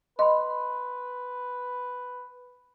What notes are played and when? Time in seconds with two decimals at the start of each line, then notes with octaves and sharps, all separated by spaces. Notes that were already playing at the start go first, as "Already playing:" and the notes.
0.19 B4 D#5 B5 C6